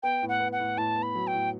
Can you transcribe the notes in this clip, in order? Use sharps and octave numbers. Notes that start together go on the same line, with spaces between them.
B3 G5
A2
F#5
B3
F#5
A2
A2 A5
B3
B5
F#3
G5
A2